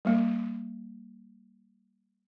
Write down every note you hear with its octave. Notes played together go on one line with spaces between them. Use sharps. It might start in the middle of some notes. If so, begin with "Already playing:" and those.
G3 A#3